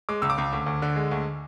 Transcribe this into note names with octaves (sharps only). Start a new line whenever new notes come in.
G#3 D6
C#2 E6
D6
C#2
D2
D2
D3
G#3
D2